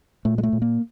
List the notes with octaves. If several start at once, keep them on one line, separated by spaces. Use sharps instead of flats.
A#2 A3
G#3
A3
A#2
A#3